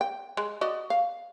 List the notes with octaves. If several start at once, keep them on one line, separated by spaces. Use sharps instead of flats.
G5
G#3
F#4 D5 D#5
F5